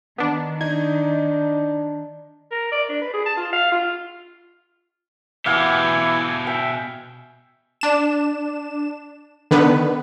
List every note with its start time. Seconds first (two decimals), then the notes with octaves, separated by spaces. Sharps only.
0.18 D#3 B3 D4
0.61 D4 D#4 D#5 G#6
2.51 A#4
2.72 D5
2.89 D4
3.02 B4
3.14 G#4
3.26 A5
3.37 F4
3.53 F5
3.72 F4
5.46 B2 E3 G4 F5 F#5 G#5 D#6
6.47 E5 G5 G#5
7.81 D4 E7
9.51 D3 D#3 B3 B4